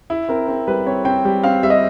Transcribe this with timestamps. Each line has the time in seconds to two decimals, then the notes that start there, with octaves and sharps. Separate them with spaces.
0.10 E4
0.29 C4 A#4
0.48 C4 A#4
0.67 G3 B4
0.86 C4 C#5
1.05 C4 G5
1.25 G3
1.43 C4 F5
1.63 G3 E5
1.70 D#5